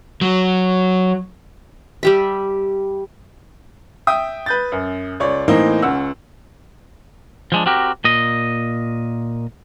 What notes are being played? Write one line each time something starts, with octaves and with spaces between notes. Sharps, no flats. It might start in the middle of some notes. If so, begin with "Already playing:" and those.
F#3
G3 G4 E5
E5 G5 D#6
B4 G6 A6
F#2
C#2 C#5 D5
A2 E3 A#3 C4 D#4
C#2 C#4 F#5 E6
F3 G#3 D4
C4 F#4 G4 A#4
A#2 D#5